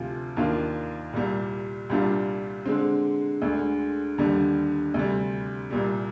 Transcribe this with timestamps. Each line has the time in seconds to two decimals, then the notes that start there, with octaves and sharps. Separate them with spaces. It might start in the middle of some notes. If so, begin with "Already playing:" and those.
Already playing: D2 C3 F3 C4 F4
0.37 D#2 D#3 A#3 D4 F4
1.13 C2 A#2 G3
1.90 C2 A#2 G3 D4 F4
2.66 D3 G#3 C4
3.42 D2 D3 G#3
4.18 D#2 D3 G3
4.94 D2 C3 G3
5.70 C2 A#2 G3